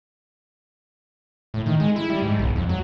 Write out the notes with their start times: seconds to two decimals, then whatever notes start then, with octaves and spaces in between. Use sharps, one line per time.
1.54 A2
1.66 D#3
1.80 G#3
1.96 E4
2.10 G3
2.22 G#2
2.39 B1
2.56 F2
2.69 F#3